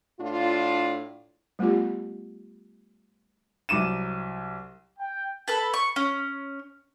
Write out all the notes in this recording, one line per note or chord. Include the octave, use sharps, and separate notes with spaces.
A2 D4 F4
G3 A3 B3 F4 G4
C2 F#3 D6 D#7 E7
G5
A4 B4 A5
C#6
C#4